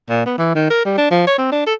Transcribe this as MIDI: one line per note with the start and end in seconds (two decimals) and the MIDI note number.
0.09 0.25 46
0.26 0.37 59
0.38 0.53 52
0.55 0.69 51
0.70 0.83 70
0.85 0.97 55
0.98 1.08 62
1.11 1.22 53
1.27 1.37 73
1.38 1.47 60
1.52 1.64 62
1.66 1.74 69